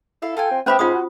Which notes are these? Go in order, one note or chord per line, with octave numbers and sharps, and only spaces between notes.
E4 A4 F5
F4 A4 G5 G#5
C4
B3 C#4 G4 C5 E5 B5 D#6
G#2 C#4 F4 C5 F#5 D#6
F#4